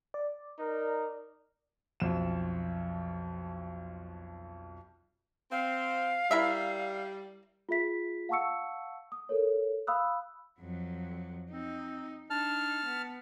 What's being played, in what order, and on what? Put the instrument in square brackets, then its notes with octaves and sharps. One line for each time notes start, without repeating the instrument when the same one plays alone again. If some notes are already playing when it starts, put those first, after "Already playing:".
[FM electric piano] D5
[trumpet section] D#4 A#4
[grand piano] B1 F2 E7
[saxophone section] C4 [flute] F5
[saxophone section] G3 [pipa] E4 A#4 E5
[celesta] F4 G#4 E5 B6
F5 F#5 A5 C#6 E6 C#7
D#6
A4 A#4 C#5
F5 B5 D#6 E6 F#6
[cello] F2 F#3
[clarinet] C4 [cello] D#4
[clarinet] D4 [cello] D#4 [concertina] A5 F6
[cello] B3